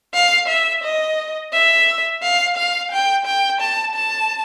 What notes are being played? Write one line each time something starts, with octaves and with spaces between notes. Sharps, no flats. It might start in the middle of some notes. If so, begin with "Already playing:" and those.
F5
E5
D#5
E5
F5
F5
G5
G5
A5
A5